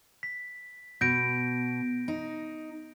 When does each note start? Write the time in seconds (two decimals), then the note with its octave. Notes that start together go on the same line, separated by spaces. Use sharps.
0.23 B6
1.01 B2 G6 A#6 D7
2.08 D#4